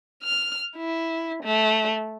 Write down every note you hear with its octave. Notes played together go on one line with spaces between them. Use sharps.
F6
E4
A3